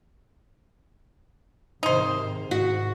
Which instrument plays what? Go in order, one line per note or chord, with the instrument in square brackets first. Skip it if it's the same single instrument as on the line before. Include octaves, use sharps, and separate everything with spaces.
[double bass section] G#2 C3 D#3 [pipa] D#4 C5
[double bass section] G#2 [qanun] F#4